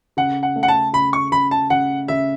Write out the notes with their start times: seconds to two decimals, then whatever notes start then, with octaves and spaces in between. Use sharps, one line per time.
0.17 C#3 F#5
0.43 F#5
0.56 A3
0.63 F#5
0.68 A5
0.93 C#3 B5
1.13 C#6
1.32 C#3 B5
1.51 A5
1.70 C#3 F#5
2.08 C#3 E5